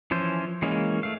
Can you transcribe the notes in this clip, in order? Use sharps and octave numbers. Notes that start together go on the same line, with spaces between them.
E3 F3 C#4 C5
E3 G#3 A#3 C#4
A3 F5